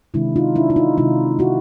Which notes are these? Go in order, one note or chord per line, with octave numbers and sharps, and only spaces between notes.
C3 D#3 G#3 D4 E4
D#4 F4
D4 E4
E4
D#4 F4
C3 D#3 G#3 D#4 F4
E4 F#4